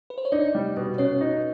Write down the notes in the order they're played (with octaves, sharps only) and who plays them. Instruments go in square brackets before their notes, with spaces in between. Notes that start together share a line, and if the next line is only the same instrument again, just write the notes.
[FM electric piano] B4
C5
C#5
[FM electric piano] D4 D5 [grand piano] D#4
[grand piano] G3
B2
[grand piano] B2 [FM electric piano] C#4 C#5
[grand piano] D#4